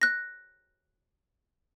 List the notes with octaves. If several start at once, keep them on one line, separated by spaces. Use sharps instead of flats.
F#6 A#6